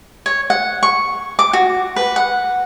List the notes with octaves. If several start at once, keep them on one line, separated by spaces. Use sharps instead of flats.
C#5
F#5
C#6
D6
F#4
B4
F#5